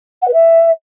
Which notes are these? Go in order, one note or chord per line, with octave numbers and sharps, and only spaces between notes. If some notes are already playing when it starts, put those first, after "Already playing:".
F#5
B4
E5